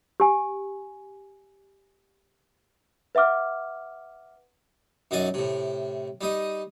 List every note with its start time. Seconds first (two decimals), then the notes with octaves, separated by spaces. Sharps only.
0.20 G4 G#5
3.15 B4 E5 F#5 D6 F6
5.11 F#2 F#3 D#4 D5 G#5
5.34 A2 C3
6.21 G3 D#4 D#5